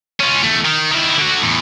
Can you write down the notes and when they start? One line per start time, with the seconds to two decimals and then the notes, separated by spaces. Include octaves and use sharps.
0.20 C#4 F4
0.43 E2 A3
0.65 D#3
0.92 D#3 E4
1.17 D3 F#4
1.42 E2 A2